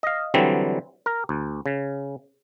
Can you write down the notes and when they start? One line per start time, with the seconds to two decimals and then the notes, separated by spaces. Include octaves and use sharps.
0.03 D#5 F5
0.34 D3 E3 F#3 G3 C4
1.06 A#4
1.29 D2
1.66 C#3